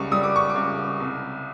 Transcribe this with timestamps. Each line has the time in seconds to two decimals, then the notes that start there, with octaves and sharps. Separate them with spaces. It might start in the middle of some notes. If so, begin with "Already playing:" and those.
Already playing: C#2 G3 C#6 D6
0.11 G3 D#6
0.23 D6
0.36 C#6
0.49 D6
0.56 C#2
1.00 C2